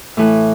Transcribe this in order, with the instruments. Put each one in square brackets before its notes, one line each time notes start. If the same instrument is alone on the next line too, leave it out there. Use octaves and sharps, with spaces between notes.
[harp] A2 E3 A3